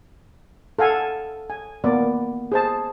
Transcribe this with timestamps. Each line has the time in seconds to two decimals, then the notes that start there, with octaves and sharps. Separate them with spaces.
0.79 A4 F5 F#5 G#5
1.50 G#5
1.84 A#3 B3 D5
2.52 G#4 C5 A5